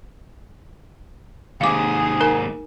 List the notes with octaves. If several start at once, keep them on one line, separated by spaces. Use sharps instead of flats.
D#2 G#2 G#4 F5 D6
D#4 A#4 G#5